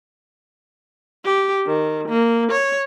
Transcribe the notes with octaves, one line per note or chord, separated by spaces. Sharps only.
G4
D#3
A#3
C#5